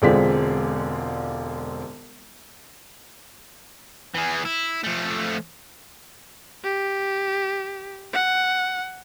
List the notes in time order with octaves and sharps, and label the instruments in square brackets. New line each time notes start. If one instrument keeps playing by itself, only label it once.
[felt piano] E1 D3 G#3 C4 F4 B6
[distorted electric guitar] E3 G#4
E4
F3 A3
[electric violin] G4
F#5